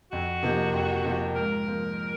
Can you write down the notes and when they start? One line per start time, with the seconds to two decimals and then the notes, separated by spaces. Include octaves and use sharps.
0.12 F2 F#4
0.43 C3 F3 A#3 D#4
0.74 F2
1.04 C3 F3 A#3 D#4
1.36 G#2 A#4
1.67 F3 A#3